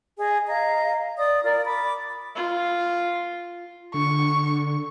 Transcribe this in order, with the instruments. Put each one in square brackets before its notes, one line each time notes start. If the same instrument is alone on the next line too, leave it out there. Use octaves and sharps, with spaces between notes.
[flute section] G#4 D#5 G#5
D#5 F5 A#5
D5 D#6
F4 A#4 D5
B5 D6
[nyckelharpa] F4
[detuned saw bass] D3 [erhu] C#6